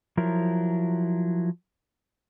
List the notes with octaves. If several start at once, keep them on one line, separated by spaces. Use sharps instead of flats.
F3 F#3 E4 A#4